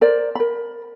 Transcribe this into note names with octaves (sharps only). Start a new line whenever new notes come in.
A#4 C5 D5
A#4 B5